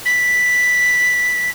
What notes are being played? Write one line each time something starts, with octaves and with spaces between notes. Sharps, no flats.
B6